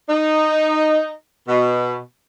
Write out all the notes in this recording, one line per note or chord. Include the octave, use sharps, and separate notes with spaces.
D#4
B2